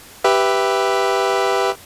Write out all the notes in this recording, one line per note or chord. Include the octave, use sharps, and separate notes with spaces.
G4 B4 E5